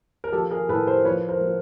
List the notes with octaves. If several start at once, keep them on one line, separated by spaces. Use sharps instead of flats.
A#4
F3 G4 A4
G#4 A#4
A2 A4 B4
A#4 C5
F3 B4 C#5
A#4 C5
F3